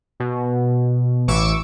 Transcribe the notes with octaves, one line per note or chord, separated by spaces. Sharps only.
B2
A1 E3 C#6 D6 E6